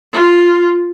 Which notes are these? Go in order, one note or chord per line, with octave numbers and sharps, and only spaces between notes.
F4